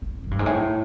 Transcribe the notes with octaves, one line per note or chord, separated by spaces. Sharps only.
A2
F#2
G2
G#2
A2